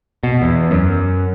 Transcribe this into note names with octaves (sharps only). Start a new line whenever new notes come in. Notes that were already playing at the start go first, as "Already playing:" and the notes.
B2
E2
F#2